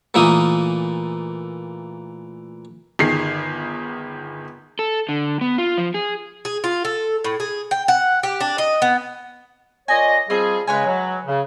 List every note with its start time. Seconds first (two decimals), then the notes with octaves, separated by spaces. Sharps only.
0.14 A#2 E3 A3 A#3 D#6
2.99 G1 D#3 G#4 C7
4.79 A4
5.09 D3
5.41 B3
5.58 F4
5.78 F3
5.94 G#4
6.45 G#4
6.64 F4
6.85 A4
7.24 A2
7.40 G#4
7.71 G5
7.88 F#5
8.23 G4
8.40 D4
8.58 D#5
8.82 B3
9.88 A#2 C#5 D#5 G#5
10.30 F3 G3 C4 G#4 D#5 C6
10.67 C#3 G#3 B4 C#5 G#5
10.86 F#3
11.26 C#3